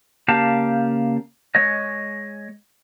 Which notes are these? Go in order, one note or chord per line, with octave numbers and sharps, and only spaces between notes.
C#3 A#3 G4 F5 A5
G#3 C#5 D#5